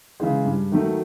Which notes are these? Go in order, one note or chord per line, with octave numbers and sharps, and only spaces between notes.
C#3 E3 G#3
G2
D#3 F#3 A3